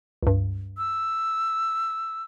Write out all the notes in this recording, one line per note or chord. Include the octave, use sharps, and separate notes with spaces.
C#2 G2
E6